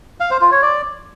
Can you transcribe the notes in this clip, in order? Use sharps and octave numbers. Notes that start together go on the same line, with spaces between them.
F5
C5
F4
C#5
D5